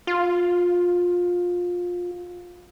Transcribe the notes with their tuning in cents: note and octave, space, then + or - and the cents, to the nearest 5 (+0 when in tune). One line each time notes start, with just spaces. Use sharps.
F4 +20